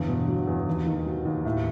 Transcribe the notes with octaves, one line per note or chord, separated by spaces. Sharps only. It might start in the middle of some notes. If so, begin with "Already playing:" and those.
Already playing: G1 E2
B2
F#3
E2
D#2
D#3
F#3
D#2
A2